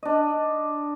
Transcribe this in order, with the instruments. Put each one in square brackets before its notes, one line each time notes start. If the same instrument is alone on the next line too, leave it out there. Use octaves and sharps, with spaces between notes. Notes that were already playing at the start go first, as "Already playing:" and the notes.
[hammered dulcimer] D4 D#5